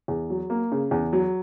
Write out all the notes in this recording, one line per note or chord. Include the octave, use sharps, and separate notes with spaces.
E2
F#3
A#3
C#3
E2
F#3